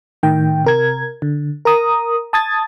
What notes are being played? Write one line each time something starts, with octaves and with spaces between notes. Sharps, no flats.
A2 D#3 G5
C3 A#4 G#6
D3
A#4 A#5 D#6
A5 D#6 G#6 A6